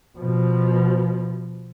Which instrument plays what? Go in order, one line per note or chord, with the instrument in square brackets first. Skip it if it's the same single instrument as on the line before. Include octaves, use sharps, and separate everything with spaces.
[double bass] B2 F3